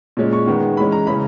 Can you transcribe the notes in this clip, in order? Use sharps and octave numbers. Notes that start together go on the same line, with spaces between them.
A#2 G#3 C#4
C#6
D#3 G#3 B3
E3 G#3 C#4 B5
A#5
C#3 E3 G#3 C#4 B5